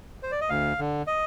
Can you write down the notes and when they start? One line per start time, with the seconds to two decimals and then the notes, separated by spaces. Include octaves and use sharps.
0.23 C5
0.32 D5
0.41 D#5
0.49 D2 F5
0.79 D3
1.07 D#5